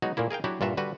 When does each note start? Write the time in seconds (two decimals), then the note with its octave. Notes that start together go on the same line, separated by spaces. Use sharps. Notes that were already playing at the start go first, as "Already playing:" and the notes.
0.02 F#3 G#3 B3 D#4 F#4
0.17 A#2 A3 A#3 E4
0.31 G#4 A#4 F5 G5
0.44 F#3 D4 E4 F#4 G4
0.61 G2 A#2 F4 F#4 E5
0.77 D3 G3 F#4 B4